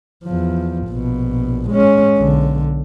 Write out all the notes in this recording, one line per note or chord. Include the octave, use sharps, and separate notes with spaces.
E2 F3
A#1 B2
G#3 C#4
B1 D3